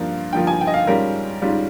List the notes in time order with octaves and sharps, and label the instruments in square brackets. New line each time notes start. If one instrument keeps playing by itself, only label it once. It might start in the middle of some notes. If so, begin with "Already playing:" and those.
Already playing: [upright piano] G2 F3 A#3 F4 F5
G2 F3 A#3 F4 G5
G#5
G5
D#5
F5
G#2 G3 C#4 F4 A#4
G#2 G3 C#4 F4